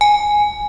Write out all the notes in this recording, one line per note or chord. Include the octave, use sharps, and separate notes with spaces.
G#5